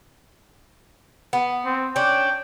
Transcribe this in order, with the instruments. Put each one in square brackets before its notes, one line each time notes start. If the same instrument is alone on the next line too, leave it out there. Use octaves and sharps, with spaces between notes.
[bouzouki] B3
[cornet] C4
[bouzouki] C#4 D4 [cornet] G5